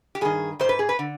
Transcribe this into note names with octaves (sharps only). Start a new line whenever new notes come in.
G4
G2 D#3 G#4
G#2 D#3 C5
B4
G#4
B4
D3